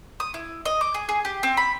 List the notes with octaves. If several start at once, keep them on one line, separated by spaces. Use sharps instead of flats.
D#6
E4
D#5
D6
G#4
G#4
G4
C4
B5